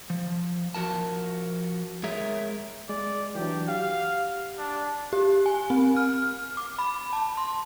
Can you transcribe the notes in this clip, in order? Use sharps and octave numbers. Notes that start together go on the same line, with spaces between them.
F3
F3 F#4 A#4 A5
G#3 G#4 A#4 C#5 E5
G#3 D5
E3 F#3 D4 G4
G4 F5 F#5
D4
G4
G#5
C4
F6
D6
B5
A5
C6